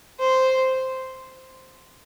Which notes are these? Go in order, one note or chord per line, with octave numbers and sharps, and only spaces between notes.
C5